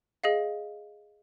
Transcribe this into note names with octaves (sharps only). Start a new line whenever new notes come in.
G#4 D#5 F5